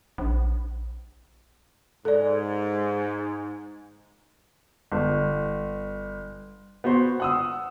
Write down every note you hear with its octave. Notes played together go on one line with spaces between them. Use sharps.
A#1
G#2 A4 D5
G1
B3 F#4 C5 C6
F#5 D#6 E6